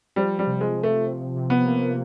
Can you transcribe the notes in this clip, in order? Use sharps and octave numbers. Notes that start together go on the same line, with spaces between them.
F3 G3
G3
C3
G#3
F3
A3
C3
C3
B3
A#3